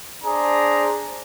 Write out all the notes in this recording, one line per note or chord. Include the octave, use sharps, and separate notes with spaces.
D4 G#4 C5 A#5